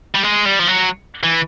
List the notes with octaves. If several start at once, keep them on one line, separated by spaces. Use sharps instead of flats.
G3
G#3
G3
F3
F#3
E3